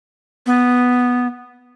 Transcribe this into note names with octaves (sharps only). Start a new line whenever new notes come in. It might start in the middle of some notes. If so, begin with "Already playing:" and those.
B3